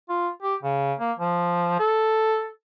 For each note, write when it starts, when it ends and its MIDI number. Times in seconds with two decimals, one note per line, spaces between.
0.09 0.30 65
0.42 0.55 67
0.63 0.93 49
0.99 1.12 58
1.19 1.76 53
1.79 2.48 69